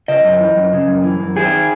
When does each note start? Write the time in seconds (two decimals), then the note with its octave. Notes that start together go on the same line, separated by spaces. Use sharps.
0.08 C#3 D#5
0.24 F#2
0.40 E3
0.56 F#2
0.73 C#3
0.88 F#2
1.03 E3
1.20 F#2
1.36 D#3 G#4